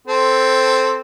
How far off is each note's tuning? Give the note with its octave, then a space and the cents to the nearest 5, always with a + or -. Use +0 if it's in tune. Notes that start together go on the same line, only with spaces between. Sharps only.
C4 +0 A4 +0